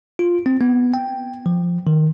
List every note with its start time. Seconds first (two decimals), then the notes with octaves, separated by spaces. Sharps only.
0.19 F4
0.46 C4
0.61 B3
0.94 G5
1.46 F3
1.87 D#3